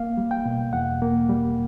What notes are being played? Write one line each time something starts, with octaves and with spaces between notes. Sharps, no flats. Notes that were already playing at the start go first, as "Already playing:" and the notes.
Already playing: A#3 F5
G3
G5
B2
E2 F#5
A#3
G3